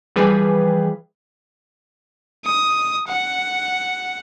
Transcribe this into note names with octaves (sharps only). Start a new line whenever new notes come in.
E3 F3 G3 G#4 B4
D#6
F#5